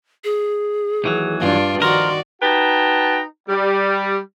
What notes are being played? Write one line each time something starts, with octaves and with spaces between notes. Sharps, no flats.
G#4
D#2 E3 F#3
G2 D4 F4
D#3 F3 F#4 A#4 D5 C6
D#4 F#4 B4 G5 A5 A#5
G3